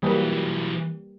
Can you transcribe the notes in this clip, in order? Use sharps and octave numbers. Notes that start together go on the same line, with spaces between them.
E3 F#3 G3 A#3 B4